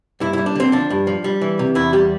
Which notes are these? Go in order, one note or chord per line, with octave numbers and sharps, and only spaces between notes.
G2 E4
G3 E4
D4
D3 C4
F3 D4
G2
F3
G3
E3
C3
E2 E4
G3 G4